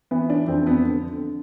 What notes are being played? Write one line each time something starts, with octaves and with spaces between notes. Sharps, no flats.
E3 B3
D4
F2 C4
B3
D3